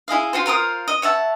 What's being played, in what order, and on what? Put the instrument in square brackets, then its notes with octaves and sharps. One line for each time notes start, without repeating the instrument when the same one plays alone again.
[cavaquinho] E4 G#4 D#5 F5
F4 F#4 C5
F4 A#4 C5 D#6
D#5
C#5 E5 F#5 A5